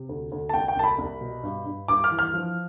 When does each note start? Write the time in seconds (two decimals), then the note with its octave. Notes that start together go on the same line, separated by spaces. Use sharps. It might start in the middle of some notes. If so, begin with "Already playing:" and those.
Already playing: C3
0.09 D2
0.32 D2
0.49 A5
0.54 C2 G5
0.68 G5
0.77 C2 A5
0.83 B5
0.99 C2
1.21 B2
1.43 G2
1.66 G2
1.88 G2 D6
2.04 F6
2.11 E3
2.19 F6
2.34 F3